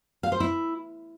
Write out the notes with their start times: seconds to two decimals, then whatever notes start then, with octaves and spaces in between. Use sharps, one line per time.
0.23 F5
0.32 C5
0.40 E4